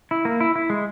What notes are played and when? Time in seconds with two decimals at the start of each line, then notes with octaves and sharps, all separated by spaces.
0.11 E4
0.25 A#3
0.40 E4
0.56 E4
0.70 G#3